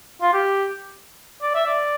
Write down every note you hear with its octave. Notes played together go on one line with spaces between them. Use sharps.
F4
G4
D5
E5
D5